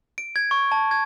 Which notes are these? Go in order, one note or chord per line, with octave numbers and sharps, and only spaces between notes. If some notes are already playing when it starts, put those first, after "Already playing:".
D7
G#6
C#6
A5
G#6